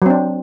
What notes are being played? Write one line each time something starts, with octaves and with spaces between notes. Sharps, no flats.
F#3 C4 D4